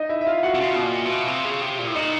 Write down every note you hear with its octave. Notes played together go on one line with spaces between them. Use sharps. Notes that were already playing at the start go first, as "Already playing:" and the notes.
Already playing: D#4 D#5
E4 E5
E5
F4 F5
F#4 F#5
C3
C#3 F4 F5
B2
A#2
B2
C3
C#3
C3
A#2
A2
A#2 D#4 D#5